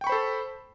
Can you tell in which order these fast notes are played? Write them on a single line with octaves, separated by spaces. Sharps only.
G5 C#6 B5 C5 A4